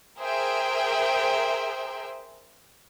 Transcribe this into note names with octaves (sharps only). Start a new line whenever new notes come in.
G#4 A#4 C5 E5 G5